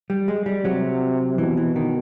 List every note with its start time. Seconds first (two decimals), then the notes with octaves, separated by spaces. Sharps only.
0.10 G3
0.28 G#3
0.46 G3
0.65 C3 F#3
1.38 B2 E3
1.57 E3
1.76 D#3